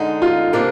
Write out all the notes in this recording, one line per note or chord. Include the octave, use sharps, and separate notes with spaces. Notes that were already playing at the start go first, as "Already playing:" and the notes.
Already playing: D3 G#3 D#4
F4
C3 F3 A#3 D4